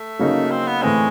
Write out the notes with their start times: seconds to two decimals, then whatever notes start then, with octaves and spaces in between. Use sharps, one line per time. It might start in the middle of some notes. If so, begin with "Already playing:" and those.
Already playing: A3
0.19 C#3 F#3 A#3 D#4
0.51 C4
0.67 B3
0.82 A2 E3 G#3 A3 C4